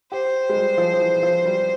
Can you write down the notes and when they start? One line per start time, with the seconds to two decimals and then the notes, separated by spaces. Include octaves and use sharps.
0.12 G4 C5
0.49 G#3
0.56 G3
0.77 F3
0.93 F3
1.01 E3
1.23 F3
1.45 G3